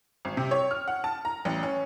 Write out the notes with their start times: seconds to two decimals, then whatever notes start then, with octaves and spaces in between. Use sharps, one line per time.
0.25 G#1
0.37 C3
0.51 C#5
0.71 F6
0.88 F#5
1.04 A5
1.25 A#5
1.45 A1
1.63 C#4